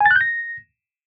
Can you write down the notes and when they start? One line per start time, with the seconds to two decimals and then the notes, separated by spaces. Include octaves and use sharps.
0.01 G#5
0.06 A6
0.11 F#6
0.16 G6
0.21 A#6